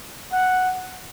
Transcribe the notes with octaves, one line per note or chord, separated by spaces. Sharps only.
F#5